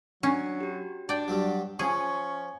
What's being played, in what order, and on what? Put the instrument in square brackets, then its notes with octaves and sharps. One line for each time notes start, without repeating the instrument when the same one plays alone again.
[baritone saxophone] F#3 [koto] C#4 [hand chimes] D4
[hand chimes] F#4 G4
[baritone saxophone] D4 [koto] D5 G5
[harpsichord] G2 F#3
[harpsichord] F3 [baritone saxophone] C#4 [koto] G#4 [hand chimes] C#6